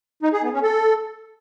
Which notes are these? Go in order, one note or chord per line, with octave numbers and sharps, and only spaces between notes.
D#4
G#4
B3
C#4
A4